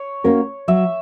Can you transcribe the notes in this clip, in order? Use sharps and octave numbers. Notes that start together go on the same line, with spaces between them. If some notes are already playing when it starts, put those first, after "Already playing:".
Already playing: C#5
A#3 C#4 F#4 A#4
F#3 E5